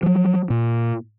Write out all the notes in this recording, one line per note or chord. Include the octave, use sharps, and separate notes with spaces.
F3 F#3
A#2